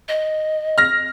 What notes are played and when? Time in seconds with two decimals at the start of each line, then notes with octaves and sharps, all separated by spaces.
0.08 D#5
0.78 F6 A#6